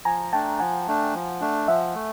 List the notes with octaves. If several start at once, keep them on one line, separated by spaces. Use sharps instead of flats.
F3 G#5 A#5
A3 D4 G5 A5
F3 F#5 G#5
A3 D4
F3
A3 D4
F3 E5 F#5
A3